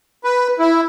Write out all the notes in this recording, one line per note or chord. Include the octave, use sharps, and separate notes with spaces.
B4
E4